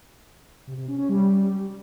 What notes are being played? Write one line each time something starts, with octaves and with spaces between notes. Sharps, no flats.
C3
C3
C#4
C#4
G3